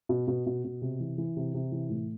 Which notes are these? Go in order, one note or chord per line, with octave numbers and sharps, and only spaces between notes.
B2
B2
B2
B2
C3
E3
E3
C3
C3
E3
A2